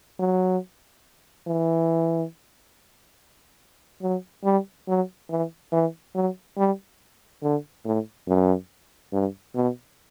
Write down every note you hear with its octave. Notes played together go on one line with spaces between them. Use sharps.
F#3
E3
F#3
G3
F#3
E3
E3
F#3
G3
D3
A2
F#2
G2
B2